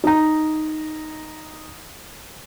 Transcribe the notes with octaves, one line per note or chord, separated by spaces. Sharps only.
D#4 A#5